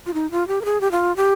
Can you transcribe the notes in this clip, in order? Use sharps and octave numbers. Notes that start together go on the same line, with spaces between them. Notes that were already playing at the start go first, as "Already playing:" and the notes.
F4
D#4
F4
G4
A#4
G#4
G4
F4
G4